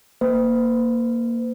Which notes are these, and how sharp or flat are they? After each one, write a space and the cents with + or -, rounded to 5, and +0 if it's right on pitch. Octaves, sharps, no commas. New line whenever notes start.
A#3 +0 C5 -45